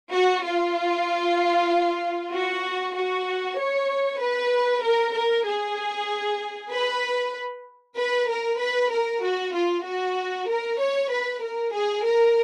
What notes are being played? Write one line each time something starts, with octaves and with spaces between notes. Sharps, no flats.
F#4
F4
F#4
F#4
C#5
B4
A#4
A#4
G#4
B4
B4
A#4
B4
A#4
F#4
F4
F#4
A#4
C#5
B4
A#4
G#4
A#4